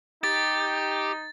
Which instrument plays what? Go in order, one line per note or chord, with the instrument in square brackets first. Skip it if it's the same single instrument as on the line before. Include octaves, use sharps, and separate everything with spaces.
[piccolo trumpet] D#4 [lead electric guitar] G4 [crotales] A6